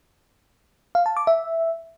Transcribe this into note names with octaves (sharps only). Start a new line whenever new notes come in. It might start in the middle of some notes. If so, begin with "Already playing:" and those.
F5
A5
D6
E5